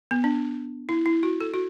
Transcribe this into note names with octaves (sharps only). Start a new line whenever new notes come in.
B3
D4
E4
E4
F#4
A4
F#4